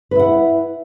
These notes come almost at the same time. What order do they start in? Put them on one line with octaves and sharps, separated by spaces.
B4 E4 F#5